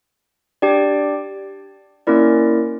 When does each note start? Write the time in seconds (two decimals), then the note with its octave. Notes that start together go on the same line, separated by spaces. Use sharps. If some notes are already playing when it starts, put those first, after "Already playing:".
0.62 D4 G4 D5 G5
2.07 A#3 C#4 E4 A#4 D5